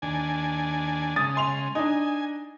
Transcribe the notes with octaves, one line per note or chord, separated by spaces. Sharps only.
D#2 D4 G#5
C#3 G#3 D#6 A6
G#5 C6 F7
D4 D#4 G#5